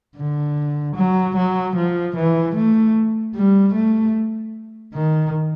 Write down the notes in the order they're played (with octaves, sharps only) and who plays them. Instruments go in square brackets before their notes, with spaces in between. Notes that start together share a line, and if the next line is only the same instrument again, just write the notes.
[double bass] D3
F#3
F#3
F3
E3
A3
G3
A3
D#3